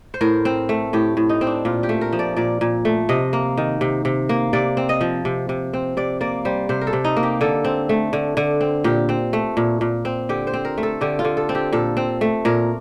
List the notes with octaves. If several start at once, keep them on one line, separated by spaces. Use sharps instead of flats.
C5
A2 A#4
C4
A3
A2 G4
A2
D#4
C4
D4
A#2 F4
G4
A3
A#4
F3
D5
A#2 D5
A#2
A3
C3 D#5
A#3
D#3
C3
C3
A#3
C3 D5
C4
D#5
F3
C3
C3
C4
C3 D5
A#3 D5
G3 C5
C3 C5
A#4
A4
C3
D#4
A#3
G4
D3 A4
C4
A3
D3
D3
C4
A#2 G4
C4
A3
A#2
A#2
C4
D3 G4
C5
C4
A#4
A3
A4
D3 G4
F4
D3
A4
C4
G4
A#2 A4
C4
A3
A#2 A#4